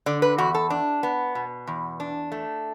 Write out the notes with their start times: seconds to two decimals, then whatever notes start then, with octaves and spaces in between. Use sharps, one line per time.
0.06 D3 D5
0.22 B4
0.38 E2 F#4
0.54 A4
0.70 D4
1.03 B3
1.35 B2
1.67 E2
2.00 D4
2.32 A3